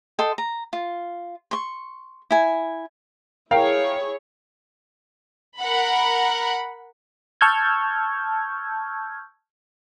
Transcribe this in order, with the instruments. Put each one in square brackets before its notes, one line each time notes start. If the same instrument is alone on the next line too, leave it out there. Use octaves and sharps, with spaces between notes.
[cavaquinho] A4 D#5 G5 C6
A#5
F4
C6 C#6
E4 G#5
[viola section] E4 G#4 C#5 [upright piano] A#4 F5 G5
[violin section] A#4 F#5 B5
[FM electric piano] A5 C#6 E6 F6 G6 G#6